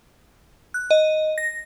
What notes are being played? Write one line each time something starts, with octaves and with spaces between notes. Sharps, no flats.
F#6
D#5
A#6